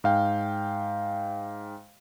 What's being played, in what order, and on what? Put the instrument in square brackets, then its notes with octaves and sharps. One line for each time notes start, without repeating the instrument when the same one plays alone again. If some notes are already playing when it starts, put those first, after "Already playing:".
[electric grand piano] G#2 F5 G5